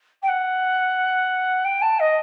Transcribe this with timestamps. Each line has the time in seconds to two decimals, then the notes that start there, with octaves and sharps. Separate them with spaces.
0.22 G5
0.28 F#5
1.64 G5
1.81 A5
1.99 D#5